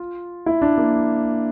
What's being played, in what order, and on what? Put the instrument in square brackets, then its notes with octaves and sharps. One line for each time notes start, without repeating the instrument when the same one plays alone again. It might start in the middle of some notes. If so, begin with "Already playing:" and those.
Already playing: [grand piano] F4
E4
D4
A#3